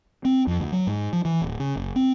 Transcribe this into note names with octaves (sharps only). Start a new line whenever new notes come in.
C4
F2
D2
F#3
G#2
F3
E3
D1
C#3
F#1
C4